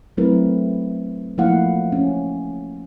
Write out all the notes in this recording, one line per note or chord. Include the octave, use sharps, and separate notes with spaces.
F#3 A3 C4 E4 A#4 B4
F3 A3 A#3 E4 F5 F#5
C#4